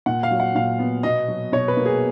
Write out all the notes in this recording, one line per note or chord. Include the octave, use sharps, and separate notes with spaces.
A#2 F#5
F5
F#3
F#5
A#2 F5
B3
B2 D#5
F#3
B2 C#5
B4
A#3
G#4